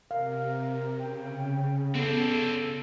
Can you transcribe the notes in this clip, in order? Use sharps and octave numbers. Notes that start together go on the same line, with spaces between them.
C3 A#4 F5
C#3 G5
B3 C4 D4 A4